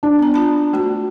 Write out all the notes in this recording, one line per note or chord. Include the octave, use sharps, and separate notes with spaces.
D4
B3 A#5
F4 A5 B5
A3 F#4